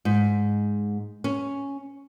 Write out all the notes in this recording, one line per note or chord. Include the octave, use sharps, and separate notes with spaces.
G#2
C#4